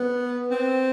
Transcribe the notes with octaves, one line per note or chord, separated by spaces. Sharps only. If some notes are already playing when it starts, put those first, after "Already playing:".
Already playing: B3
C4